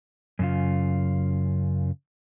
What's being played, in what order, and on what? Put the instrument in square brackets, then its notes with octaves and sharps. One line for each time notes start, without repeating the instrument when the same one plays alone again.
[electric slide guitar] F#2 C#3 F4